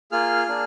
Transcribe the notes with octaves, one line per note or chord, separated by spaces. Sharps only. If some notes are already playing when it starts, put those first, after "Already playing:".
A#3 F4 G#4 F6
A#3 D4 G#4